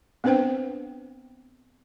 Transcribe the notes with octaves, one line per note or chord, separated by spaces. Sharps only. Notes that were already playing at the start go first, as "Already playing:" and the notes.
B3 C4 D4 B4 C5 G5